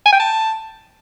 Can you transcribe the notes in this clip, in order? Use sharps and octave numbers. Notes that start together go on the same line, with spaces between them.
G#5
G5
A5